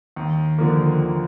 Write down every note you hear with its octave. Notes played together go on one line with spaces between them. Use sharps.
D#2
D3 F3 A#3
D#2